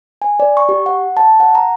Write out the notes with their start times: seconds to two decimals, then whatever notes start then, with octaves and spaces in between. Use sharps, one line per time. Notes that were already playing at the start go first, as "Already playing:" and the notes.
0.22 G#5
0.40 D5
0.57 C#6
0.69 G4
0.86 F#5
1.17 A5
1.40 F#5
1.55 A#5